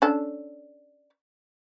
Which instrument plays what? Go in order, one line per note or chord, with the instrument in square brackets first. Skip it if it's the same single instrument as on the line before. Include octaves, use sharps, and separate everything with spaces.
[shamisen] C#4 D4 A4